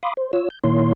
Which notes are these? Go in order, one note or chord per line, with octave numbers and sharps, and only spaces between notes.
F5 B5 C6 D6 D#6
C5
F4 C#5 E6
G6
A#2 D#3 A#3 E4 C#5 C6